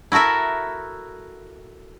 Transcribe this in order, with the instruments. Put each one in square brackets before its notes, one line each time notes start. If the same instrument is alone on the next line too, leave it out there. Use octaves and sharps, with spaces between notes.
[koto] E4 F#4 A4 A#4 E5